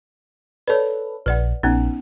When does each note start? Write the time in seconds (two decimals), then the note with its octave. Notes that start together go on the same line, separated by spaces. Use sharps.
0.68 A4 B4 C#5 D5
1.26 A#1 B4 D5 F#5
1.63 A#1 B3 C#4 D#4